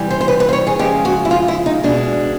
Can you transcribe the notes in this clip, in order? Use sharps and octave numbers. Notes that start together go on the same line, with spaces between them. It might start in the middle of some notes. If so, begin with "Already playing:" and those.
Already playing: C3 E3 G3
C5
C5
B4
B4
C5
C#5
G#4
C#3 F3 G#3 G4
F#4
E4
F4
E4
D#4
B2 G#3 D4